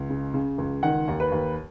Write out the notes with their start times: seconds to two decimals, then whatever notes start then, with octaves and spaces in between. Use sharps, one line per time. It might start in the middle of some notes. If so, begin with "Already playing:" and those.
Already playing: C#2
0.10 C#3
0.34 C#3
0.58 C#2
0.83 D#3 F#5
1.08 D#2
1.20 B4
1.32 D#2